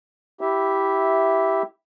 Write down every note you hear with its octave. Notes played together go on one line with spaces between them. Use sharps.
E4 G4 E5